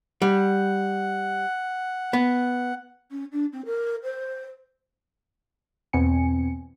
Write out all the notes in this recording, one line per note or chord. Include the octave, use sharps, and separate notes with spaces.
G3 F#5
B3
C#4
D4
C4
A#4
C5
E2 B2 C4 G#5 C#7